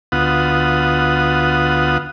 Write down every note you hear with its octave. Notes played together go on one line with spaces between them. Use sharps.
D2 B3 F4 F#5 D#6